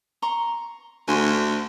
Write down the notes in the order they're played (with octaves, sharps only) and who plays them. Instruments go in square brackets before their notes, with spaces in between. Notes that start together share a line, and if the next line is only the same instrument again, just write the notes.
[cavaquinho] A#5 C6 C#6
[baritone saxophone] D2 [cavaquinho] G#5 C6